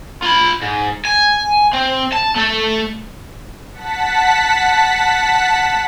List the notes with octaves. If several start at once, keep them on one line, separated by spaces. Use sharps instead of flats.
F4 B5
G#2
G#5
C4
A5
A3 A4
F#5 A5 B6